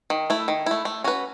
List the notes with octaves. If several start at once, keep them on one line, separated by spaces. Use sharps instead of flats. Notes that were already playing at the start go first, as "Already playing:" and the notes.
D#3
A3 E4
D#3
A3 E4
A3
C#4 F#4 B4